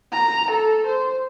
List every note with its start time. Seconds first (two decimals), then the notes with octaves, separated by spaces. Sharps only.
0.13 A#5
0.51 A4
0.87 C5